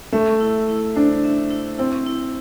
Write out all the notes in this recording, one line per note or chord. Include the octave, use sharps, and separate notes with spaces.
A3 E5
E4
E4
D4 C5
E5
E4
C4 E4
E4